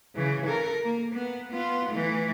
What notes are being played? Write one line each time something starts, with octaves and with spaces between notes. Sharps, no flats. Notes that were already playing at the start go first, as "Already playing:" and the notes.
C#3 E3
A4 A#4
A#3
B3
B3 F4
E3 A3